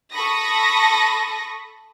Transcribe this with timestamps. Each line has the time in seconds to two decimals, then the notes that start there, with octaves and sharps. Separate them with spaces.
0.12 A4 B5 C#6 D#6 A#6